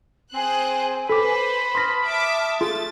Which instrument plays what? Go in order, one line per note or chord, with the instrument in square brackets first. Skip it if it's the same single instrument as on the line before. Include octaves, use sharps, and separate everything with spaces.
[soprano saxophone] C4 [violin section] G#4 C5 F#6 [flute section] G#5
[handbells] A4 D6 [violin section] B4 C5 [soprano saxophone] B5
[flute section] A5 D#6 F6 [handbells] C6 A#6
[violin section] E5 D6
[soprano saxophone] A3 [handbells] F4 G#4 [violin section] A6